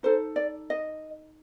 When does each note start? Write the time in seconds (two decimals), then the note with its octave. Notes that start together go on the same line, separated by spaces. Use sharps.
0.03 D#4 A4 C5
0.36 D5
0.70 D#5